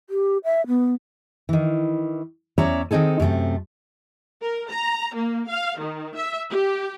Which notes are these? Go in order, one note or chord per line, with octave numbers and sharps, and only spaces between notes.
G4
E5
B3
D#3 E3
E2 C#4 C#5 D5 E5 A#5
D#3 C4 D#4 G#4 A4
F#2 C3 A3 C4
A#4
A#5
A#3
F5
D#3
E5
G4